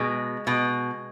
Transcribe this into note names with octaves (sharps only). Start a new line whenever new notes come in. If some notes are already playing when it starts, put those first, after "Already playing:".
Already playing: B2 G#3
B2